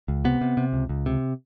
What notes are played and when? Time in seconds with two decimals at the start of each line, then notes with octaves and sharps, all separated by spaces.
0.08 C#2
0.25 C3 B3
0.41 C3
0.57 C3
0.73 C#2
0.89 C#2
1.06 C3